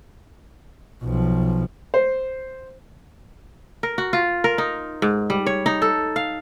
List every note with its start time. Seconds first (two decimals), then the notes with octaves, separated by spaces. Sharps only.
1.03 B1 F3
1.94 C5
3.83 A#4
3.98 F#4
4.13 F4
4.44 A#4
4.58 D#4
5.02 G#2
5.30 G3
5.46 C#5
5.66 D#4
5.82 A4
6.16 F5